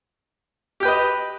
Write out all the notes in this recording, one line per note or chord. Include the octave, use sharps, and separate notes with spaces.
G4 B4 D#5 G5